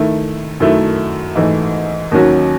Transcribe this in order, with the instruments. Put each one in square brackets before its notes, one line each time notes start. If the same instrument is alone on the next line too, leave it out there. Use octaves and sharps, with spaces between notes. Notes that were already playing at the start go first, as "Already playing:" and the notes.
Already playing: [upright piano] D#3 A3 E4
F#2 D#3 A3 E4
G#2 E3 A3
D#2 D#3 F#3 C#4 F#4